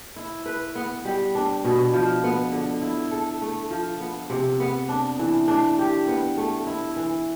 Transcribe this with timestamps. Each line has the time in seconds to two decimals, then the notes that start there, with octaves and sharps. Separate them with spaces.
0.16 E4
0.46 B4
0.75 B3
1.05 G3
1.35 D4
1.64 B2
1.93 F3
2.24 B3
2.52 D3
2.82 E4
3.11 A4
3.41 A3
3.70 F3
4.00 B3
4.30 C3
4.60 B3
4.89 D4
5.19 E3
5.48 D4
5.78 G4
6.08 B3
6.37 A3
6.67 E4
6.96 E3